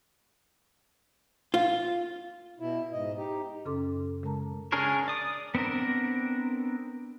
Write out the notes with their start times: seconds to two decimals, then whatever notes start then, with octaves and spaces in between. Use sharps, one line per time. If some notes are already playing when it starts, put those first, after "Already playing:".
1.54 F4
2.60 B2 E4
2.92 G#2 D#5
3.18 D#4 G4
3.65 F#2 C#3 C#4 A4 C6 D6
4.23 C#3 G#3 A#4 A5 A#5
4.72 C#4 D4 G#4 A#4 C#5
5.08 D5 D#6
5.55 B3 C4 D4 A#4